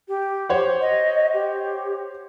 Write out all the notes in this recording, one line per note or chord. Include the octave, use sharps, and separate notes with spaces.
G4
C5 C#5 F#5
D#5
G4